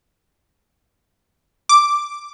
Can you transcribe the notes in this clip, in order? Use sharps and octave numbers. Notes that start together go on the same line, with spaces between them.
D6